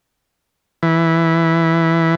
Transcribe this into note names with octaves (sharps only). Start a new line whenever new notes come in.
E3